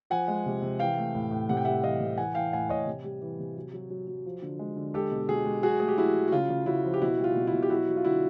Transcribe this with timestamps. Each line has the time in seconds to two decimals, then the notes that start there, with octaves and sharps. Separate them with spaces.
0.10 F3 F#5 G#5
0.28 G#3
0.46 C3
0.62 C3
0.79 E3 F5 G5
0.97 A3
1.15 A2
1.31 A2
1.49 C3 F#5
1.57 G5
1.65 G3 E5 F#5
1.83 E3 D#5 F5
2.00 C3
2.17 E3 F#5 G#5
2.35 E3 F5 G5
2.53 A2 F#5 G#5
2.69 A2 C#5 D#5
2.87 C3
3.04 G3
3.22 E3
3.39 C3
3.57 F#3
3.74 F#3
3.90 F#3
4.07 F#3
4.26 F3
4.42 D3
4.59 G#3
4.76 D3
4.94 G#3 G4 A4
5.11 B2
5.29 B2 F#4 G#4
5.45 G#3
5.63 F#3 F#4 G#4
5.80 A3 G#4
5.88 G4
5.98 F#3 E4 F#4
6.14 F#3
6.28 F#4
6.32 C#3 F4
6.50 C#3
6.66 C#3 E4 F#4
6.85 F3
6.94 G4
7.01 B2 E4 F#4
7.18 G3
7.24 F4
7.36 B2
7.47 E4
7.53 B2
7.63 G4
7.70 F#3 E4 F#4
7.88 F#3
7.97 F4
8.05 D3 E4 F#4